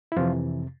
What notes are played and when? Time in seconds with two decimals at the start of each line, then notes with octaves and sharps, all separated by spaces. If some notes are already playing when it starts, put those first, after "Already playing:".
0.12 E4
0.16 F2 C3 E3 F3 F4